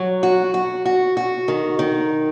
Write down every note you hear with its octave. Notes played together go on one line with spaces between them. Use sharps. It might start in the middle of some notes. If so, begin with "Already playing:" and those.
Already playing: F#3
F#4
F#4
F#4
F#4
D#3
D#3